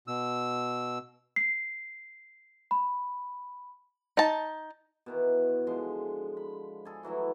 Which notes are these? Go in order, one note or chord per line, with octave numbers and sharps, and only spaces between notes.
B2 E6
C7
B5
D#4 A5
B2 D#3 E3
D3 F3 G#3 C6
B5
G#4 A4
E3 F#3 A3 E4